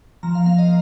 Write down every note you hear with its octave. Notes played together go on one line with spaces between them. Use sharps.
F3 A#5
F5
A#3 F5
D#5